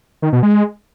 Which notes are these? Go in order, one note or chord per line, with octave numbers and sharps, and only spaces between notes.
D#3
B2
G#3